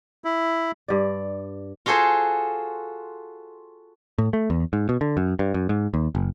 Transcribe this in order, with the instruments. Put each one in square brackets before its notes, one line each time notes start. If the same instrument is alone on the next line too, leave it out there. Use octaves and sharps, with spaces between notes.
[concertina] E4
[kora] G2 D5
[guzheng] F4 F#4 G#4 A4 C5
[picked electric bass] A2
A3
E2
G#2
B2
D3
F#2
G2
F#2
G#2
D#2
F#1